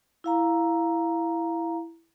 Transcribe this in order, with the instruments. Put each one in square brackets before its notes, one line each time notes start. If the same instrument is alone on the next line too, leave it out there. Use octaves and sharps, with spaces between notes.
[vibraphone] E4 F5 A#5